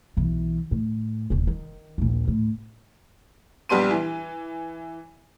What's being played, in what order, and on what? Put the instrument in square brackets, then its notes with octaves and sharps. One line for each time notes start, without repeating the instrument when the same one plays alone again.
[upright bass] B1 E3
A2
D#1 D3
D#3
A#1 D#2
A2
[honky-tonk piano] A#1 G3 B3 C6 D#7
E3